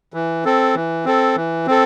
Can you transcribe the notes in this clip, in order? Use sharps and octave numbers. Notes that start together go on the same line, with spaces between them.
E3
C4 A4
E3
C4 A4
E3
C4 A4